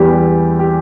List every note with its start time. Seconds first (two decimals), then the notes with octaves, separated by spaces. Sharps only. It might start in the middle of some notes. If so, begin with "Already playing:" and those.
Already playing: E2 E3 G3 G4
0.59 G4